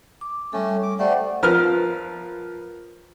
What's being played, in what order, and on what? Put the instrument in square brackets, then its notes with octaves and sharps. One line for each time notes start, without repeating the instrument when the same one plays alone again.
[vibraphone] D6
[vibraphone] G3 A4 [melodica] A3 C#4
[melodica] D6
[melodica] G3 A3 [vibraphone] C5 F#5 G5
[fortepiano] F3 A#4 B4 F6